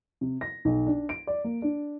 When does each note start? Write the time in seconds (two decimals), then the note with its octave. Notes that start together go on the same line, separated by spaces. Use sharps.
0.21 C3
0.41 A#6
0.65 B1
0.87 D4
1.09 D7
1.27 D5
1.44 A#3
1.62 D4